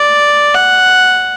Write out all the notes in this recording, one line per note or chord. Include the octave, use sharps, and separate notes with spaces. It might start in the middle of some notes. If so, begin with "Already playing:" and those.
Already playing: D5
F#5